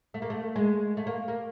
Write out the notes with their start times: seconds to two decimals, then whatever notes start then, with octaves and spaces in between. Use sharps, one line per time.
0.14 A3
0.22 A#3
0.30 A3
0.56 G#3
0.97 A3
1.07 A#3
1.28 A#3